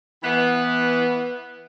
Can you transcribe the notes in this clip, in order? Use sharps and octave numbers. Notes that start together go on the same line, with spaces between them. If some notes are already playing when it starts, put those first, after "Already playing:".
E3 B3